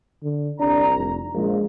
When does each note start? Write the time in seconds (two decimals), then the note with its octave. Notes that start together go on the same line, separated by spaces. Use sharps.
0.23 D3
0.60 C2 D4 A#5
0.96 F1
1.34 A#1 G#3 F4